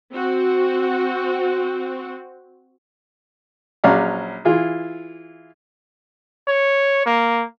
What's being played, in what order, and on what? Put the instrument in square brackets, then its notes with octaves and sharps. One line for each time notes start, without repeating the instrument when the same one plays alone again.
[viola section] C4 F#4
[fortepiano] A#1 F#3 C#4 D5 F5 A#5
E3 F4 G#4
[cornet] C#5
A#3